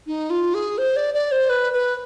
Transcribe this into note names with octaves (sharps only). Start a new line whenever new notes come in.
D#4
F4
G#4
C5
D5
D5
C5
B4
B4